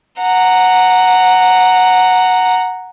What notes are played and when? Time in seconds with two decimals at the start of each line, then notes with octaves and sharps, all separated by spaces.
0.20 F#5 A#5